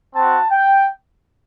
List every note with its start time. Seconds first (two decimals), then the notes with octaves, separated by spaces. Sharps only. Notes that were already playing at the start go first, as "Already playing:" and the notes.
0.14 C4 F#4 A5
0.50 G5